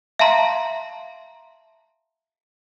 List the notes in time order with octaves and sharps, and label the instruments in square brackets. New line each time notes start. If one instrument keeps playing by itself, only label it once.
[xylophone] E5 F5 A5 A#5 C6